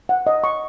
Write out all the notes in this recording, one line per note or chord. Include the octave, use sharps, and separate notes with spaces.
F#5
D#5
C#6